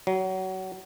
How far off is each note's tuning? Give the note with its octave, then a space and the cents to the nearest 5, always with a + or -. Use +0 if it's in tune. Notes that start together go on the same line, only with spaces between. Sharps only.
F#3 +25